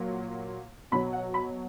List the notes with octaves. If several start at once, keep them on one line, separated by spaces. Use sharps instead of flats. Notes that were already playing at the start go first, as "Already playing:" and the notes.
Already playing: A#2 F#3
B2 F#3 B5
F#5
B5